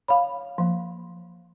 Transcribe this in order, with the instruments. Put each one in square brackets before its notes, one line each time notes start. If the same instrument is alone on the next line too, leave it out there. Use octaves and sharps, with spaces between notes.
[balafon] C#5 [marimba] F5 B5
[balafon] F3 A#3